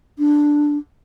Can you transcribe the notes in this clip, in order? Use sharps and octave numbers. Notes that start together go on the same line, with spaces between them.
D4